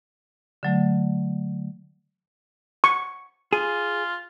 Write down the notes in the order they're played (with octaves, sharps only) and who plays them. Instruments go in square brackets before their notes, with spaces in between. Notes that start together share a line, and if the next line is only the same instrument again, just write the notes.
[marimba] D3 F#3 A3
[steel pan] C#6
[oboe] F4 [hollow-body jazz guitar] G#4